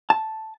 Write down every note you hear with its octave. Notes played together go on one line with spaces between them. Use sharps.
A5